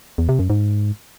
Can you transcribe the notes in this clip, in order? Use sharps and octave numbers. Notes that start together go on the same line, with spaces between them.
E2
C3
F#2
G#2